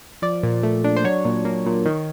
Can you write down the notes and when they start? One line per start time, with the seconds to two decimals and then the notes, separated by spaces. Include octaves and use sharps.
0.22 F3 D5
0.43 A#2
0.63 A3
0.84 D4
0.96 C5
1.04 F#3 C#5
1.25 A#2
1.45 A#3
1.66 A#2
1.86 D#3